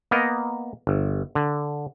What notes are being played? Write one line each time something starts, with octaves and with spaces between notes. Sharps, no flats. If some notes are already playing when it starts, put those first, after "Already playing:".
A#3 B3 A#4 D#5
G1
D3